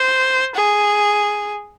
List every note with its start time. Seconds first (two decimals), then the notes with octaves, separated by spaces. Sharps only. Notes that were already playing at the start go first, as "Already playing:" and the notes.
Already playing: C5
0.55 G#4